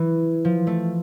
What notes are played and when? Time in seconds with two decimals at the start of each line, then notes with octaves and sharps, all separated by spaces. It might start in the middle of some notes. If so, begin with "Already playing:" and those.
Already playing: E3
0.45 F3
0.67 A3